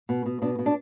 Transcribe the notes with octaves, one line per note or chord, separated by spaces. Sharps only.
B2
B2
B2 D4
B2
D4